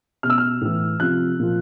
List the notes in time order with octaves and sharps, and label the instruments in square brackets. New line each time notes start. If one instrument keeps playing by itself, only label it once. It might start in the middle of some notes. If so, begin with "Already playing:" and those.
[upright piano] B2 F6
E6
F6
A2 E3
C3 F3 F#6
A#2 F3